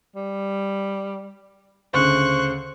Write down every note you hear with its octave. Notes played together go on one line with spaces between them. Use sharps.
G3
D2 C#3 C5 C#6 F#6